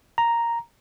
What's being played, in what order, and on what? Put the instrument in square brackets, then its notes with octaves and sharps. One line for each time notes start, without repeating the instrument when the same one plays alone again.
[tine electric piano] A#5